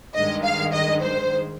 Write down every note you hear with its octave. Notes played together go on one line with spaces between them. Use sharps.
G2 D#3 G#3 D#5
F5
D#5
C5